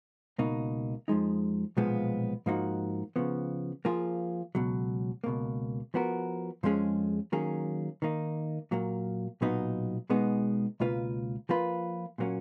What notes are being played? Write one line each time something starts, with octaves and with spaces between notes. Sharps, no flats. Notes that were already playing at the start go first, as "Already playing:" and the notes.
C#2 B2 A#3 D#4
F2 F3 G#3 D#4
B1 A#2 F3 G#3 B3
G#2 F3 A#3 D#4 F#4
C#3 F3 B3
F3 A#3 F4 G#4
C#2 B2 F#3
C#2 B2 A#3
F3 B3 F#4 A#4
F2 F3 G#3 C#4 G#4
D#3 F#3 A#3 C#4 G#4
D#3 A#3 D#4
A#2 F#3 A#3
B1 A#2 F#3 B3 D#4
B2 G#3 B3 D#4 G#4
C#2 B2 A#3 F4 B4
F3 A#3 F4 B4
A#2 F#3 A#3 C#4